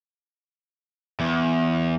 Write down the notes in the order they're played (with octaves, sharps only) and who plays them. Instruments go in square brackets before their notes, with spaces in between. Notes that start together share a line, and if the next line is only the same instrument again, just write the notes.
[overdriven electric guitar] E2